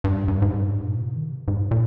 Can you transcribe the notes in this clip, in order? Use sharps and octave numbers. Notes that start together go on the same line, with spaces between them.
G2
G2
G#2
G2
G#2
A#2
C3
D#3
G#2
A#2